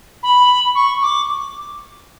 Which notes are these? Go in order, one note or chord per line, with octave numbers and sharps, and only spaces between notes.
B5
C#6
D6